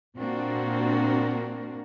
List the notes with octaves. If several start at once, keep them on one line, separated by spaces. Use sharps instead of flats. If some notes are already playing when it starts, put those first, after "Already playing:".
A#2 A#3 C4 D4 F#4 A#4